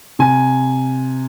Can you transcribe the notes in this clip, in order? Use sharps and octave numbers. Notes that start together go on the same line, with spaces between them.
C3 G#5